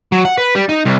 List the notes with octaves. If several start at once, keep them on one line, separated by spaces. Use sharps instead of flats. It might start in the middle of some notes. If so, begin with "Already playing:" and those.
F#3
F#5
B4
G3
D#4
C2